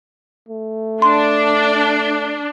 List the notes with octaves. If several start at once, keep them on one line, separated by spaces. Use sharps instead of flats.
A3
D4 C6